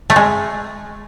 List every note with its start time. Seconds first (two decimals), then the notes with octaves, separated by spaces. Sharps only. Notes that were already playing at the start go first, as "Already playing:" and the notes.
0.10 A3
0.16 G#3